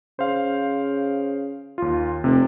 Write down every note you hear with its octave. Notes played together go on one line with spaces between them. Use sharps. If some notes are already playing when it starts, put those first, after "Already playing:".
C#3 C5 F5
D#2 F4
F1 C3